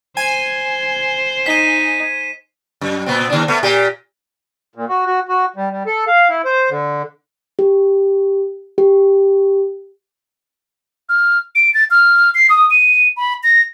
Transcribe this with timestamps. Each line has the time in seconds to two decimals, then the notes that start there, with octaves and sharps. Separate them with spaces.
0.17 C5 G#5
1.46 D#4 B6 D#7
2.81 F#2
3.06 A#2 B3 C4
3.30 D#2 D4
3.48 A3 B3
3.63 A#2 G4
4.75 A#2
4.89 F#4
5.06 F#4
5.29 F#4
5.56 G3
5.71 G3
5.86 A4
6.07 F5
6.29 E4
6.45 C5
6.70 D3
7.59 G4
8.78 G4
11.09 F6
11.55 D7
11.74 A6
11.91 F6
12.35 C7
12.50 D#6
12.70 D#7
13.17 B5
13.43 A#6